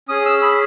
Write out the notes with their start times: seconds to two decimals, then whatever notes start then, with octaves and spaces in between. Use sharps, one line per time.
0.09 C#4 G#4 D#6
0.25 E6
0.42 B5